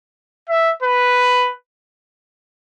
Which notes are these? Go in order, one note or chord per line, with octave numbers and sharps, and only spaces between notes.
E5
B4